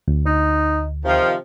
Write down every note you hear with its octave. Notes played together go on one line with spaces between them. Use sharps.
D2
D#4
C3 D#3 F3